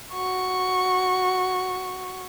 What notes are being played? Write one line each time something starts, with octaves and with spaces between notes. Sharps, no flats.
F#4 C#6